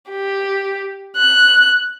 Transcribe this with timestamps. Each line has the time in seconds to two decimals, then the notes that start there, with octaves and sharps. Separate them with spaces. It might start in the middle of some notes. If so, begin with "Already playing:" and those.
0.10 G4
1.17 F#6